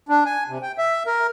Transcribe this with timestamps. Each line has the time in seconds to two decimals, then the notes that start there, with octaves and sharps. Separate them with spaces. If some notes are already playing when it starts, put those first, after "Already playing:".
0.09 D4
0.25 G#5
0.48 C3
0.62 G5
0.78 E5
1.07 A#4